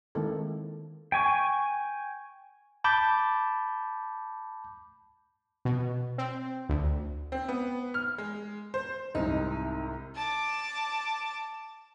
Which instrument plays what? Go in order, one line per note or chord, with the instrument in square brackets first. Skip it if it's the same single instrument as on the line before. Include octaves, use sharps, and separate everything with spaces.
[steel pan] D#3 G#3 A#3 C4 E4 A4
[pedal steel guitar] G5 G#5 C#6
[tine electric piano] A5 B5 D6 G6
[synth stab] B2
C4
D2
[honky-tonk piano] C4
B3
F6
G#3
C5
[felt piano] C2 G#2 C3 [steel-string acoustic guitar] D#4
[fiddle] A5 D6